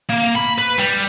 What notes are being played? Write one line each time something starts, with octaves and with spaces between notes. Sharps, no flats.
A#3
B5
B4
G3